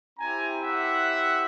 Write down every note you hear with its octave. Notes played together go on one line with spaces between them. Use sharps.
C4 E4 G4 G#5 A#5
E5 F#5